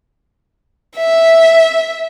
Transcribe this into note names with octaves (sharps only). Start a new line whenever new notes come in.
E5